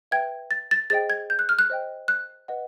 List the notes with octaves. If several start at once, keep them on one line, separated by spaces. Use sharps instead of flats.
B4 E5 G5 G#6
A6
A6
G#4 C5 D#5 G5 A6
G#6
G6
F#6
F6
F#6
C5 D#5 G5
F#6
B4 D#5 F#5